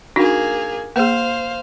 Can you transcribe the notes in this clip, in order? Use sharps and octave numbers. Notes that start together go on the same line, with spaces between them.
A#3 D4 D#4 F#4 G#4
A#3 G#4 C5 F5